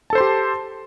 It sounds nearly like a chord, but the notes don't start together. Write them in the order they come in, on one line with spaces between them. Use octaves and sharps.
A5 A4 C5 C6 G4